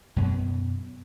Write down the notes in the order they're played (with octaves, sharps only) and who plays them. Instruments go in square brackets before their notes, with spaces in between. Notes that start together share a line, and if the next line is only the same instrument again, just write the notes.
[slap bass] F#2 B2 B3